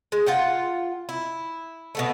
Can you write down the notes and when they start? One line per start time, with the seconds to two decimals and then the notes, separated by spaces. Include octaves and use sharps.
0.12 G#3
0.26 F4 F#5 G5
1.09 E4
1.95 B2 D3 A3